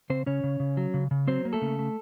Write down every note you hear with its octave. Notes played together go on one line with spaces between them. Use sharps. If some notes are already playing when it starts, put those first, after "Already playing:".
C#3 C4 C5
C#3 C#4 C#5
C#3
C#3
F#3
C#3
C#3
F#3 C4 C5
A#3
A3 A4
C#3
A3